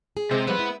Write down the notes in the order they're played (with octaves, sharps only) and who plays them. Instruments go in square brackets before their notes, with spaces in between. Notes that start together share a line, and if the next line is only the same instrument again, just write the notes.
[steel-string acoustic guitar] G#4
[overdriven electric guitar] C3 [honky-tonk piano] G#3 C4
[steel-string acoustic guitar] F3 G3 C5 [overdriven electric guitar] B3 B4
[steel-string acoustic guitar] E4